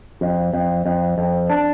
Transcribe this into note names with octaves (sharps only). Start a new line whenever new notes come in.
F2
F2
F2
F2
D4